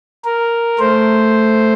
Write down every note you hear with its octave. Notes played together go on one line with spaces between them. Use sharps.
A#4
A3 C5